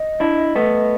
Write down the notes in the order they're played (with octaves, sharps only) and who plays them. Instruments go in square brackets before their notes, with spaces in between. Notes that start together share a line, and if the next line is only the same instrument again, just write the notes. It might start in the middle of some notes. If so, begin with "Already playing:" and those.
Already playing: [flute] D#5
[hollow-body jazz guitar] D4 E4
A3 B3